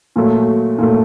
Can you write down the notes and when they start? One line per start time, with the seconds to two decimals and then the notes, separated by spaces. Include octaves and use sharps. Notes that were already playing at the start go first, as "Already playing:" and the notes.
0.16 A#2 F#3 A3
0.78 A#2 F#3 A3